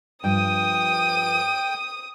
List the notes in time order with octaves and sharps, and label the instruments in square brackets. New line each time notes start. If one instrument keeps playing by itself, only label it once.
[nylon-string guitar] G2 F3 [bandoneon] G5 [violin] D#6 D#7